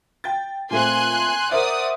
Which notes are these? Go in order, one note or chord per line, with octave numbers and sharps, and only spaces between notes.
G5 A6
A#2 A3 C4 G#5 C6 F#6
A#4 C5 D5 E5 F#5 D#6